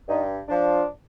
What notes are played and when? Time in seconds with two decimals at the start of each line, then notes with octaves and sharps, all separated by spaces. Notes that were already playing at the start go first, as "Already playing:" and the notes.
0.08 G2 D#4
0.48 F3 D4